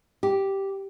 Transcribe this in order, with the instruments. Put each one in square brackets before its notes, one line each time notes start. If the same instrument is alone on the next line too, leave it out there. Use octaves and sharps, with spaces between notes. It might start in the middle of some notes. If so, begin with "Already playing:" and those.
[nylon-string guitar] G4